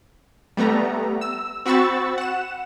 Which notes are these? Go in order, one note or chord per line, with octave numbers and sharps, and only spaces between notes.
G3 A3 B3 A#5
E6
C4 F#4 B5 C#6 E6 A6
F#5 E7